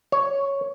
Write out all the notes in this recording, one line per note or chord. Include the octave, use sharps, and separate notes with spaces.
C#5